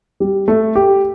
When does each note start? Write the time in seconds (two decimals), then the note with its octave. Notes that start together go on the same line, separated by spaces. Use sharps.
0.20 G3
0.48 A3
0.75 G4